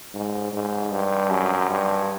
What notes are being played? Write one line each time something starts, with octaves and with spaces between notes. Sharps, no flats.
G#2
G#2
G2
F#2
G2